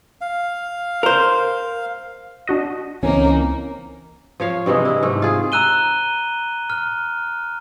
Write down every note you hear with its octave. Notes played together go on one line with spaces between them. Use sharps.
F5
A#4 C5
D4 F#4 D#5
C#2 E3 A#3 C4 C#4 D#4
F3 C#5 F5
G2 C3 E3 G#3
E4
G#2 A3
F4 G#4
A#5 E6 F#6 D#7 G7
F6